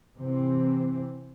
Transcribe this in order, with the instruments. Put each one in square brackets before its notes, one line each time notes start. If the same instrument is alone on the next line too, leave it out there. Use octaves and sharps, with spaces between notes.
[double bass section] C3 E3 C4